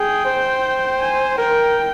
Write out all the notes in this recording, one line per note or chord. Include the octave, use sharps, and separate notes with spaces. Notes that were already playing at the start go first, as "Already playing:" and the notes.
Already playing: G#4 G5
C5
G#5
A#4 G5